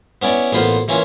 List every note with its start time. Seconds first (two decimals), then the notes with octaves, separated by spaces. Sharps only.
0.22 B3 C#4 E4 D5
0.52 A1 A#3 B3 F4 B4 C5
0.88 E3 A#3 C#4 E4 F4